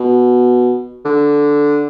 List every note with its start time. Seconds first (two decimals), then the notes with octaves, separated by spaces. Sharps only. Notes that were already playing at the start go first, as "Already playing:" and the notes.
Already playing: B2
1.05 D3